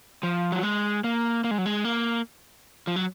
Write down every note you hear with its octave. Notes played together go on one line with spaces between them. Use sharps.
F3
F#3
G#3
A#3
A#3
G#3
F#3
G#3
A#3
F3
F#3